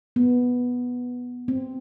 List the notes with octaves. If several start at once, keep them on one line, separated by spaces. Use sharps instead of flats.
B3
C4